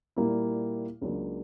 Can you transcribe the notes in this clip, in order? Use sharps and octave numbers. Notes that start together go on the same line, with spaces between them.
A#2 G3 A#3 E4
C#2 C#3 F#3 A#3 D4